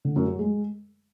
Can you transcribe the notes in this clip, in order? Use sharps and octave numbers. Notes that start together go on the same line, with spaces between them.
D3
F#2
F#3
G#3